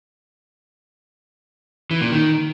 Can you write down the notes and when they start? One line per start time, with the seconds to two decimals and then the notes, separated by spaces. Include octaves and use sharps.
1.91 E3
2.01 A#2
2.11 D#3